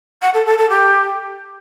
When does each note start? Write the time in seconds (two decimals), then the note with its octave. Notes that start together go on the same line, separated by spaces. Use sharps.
0.22 F#5
0.34 A4
0.46 A4
0.58 A4
0.70 G4